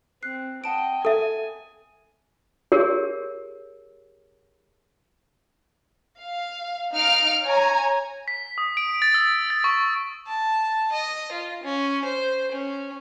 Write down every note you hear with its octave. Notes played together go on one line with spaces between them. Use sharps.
C4 F#6 C7
D#5 F#5 G5 A5 D7
A4 E5 G#5
G4 G#4 A#4 C#5
F5
D#4 F5 F6 D7
C#5 G#5 A#5
B6
D#6
D7
A6
E6
A6
C#6
A5
D#5
F4
C#4
C5
C#4